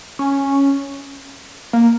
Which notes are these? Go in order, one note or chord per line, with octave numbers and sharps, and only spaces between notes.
C#4
A#3